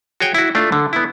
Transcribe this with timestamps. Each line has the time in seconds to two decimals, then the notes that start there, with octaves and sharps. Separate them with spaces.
0.20 F#4 G#4 C#5 G5
0.34 E4 F#4
0.55 A3 D4 F4
0.72 D3
0.93 B3 E4